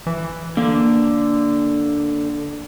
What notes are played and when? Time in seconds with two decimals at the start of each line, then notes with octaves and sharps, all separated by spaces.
0.06 E3
0.57 D3 A#3